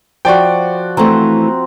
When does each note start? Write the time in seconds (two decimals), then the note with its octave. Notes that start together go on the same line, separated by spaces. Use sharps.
0.25 F3 F#4 D5 G5
0.97 E3 A3 C4 A#5